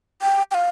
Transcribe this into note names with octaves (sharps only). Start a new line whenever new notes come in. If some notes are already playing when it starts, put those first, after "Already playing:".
G5
G5
F5